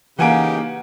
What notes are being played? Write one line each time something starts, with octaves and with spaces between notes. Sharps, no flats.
C#3 E3 A#3 D#4 G4 F#5 G#5 D7